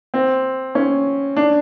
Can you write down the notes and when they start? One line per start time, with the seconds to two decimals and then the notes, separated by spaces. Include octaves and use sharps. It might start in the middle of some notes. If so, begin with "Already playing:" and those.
0.14 C4
0.75 C#4
1.37 D4